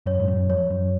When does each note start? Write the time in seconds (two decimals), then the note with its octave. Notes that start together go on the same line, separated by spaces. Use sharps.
0.06 F#2 C#5
0.20 G#2
0.28 F#2
0.49 F2 C#5
0.70 F#2